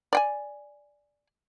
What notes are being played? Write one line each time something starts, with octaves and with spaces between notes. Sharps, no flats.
D5 G5 G#5